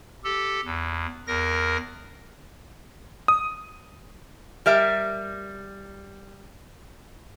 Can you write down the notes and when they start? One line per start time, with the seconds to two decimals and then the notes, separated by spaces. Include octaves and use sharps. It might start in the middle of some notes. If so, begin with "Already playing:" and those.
0.24 G4 A4
0.64 E2
1.27 E2 A#4 A#6
3.28 D#6
4.66 G3 A#4 E5